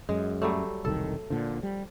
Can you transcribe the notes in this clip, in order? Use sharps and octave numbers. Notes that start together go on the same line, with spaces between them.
F#2 G#3
F#3 G3 A3
E1 C2 D#3 A4
A#2 D3 F3
G3